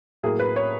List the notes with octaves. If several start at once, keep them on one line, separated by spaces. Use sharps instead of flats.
A2 F#3 A#3 G#4
B4
C#5